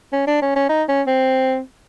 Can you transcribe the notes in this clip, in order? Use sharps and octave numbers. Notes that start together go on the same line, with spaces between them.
C#4
D4
C#4
C#4
D#4
C#4
C4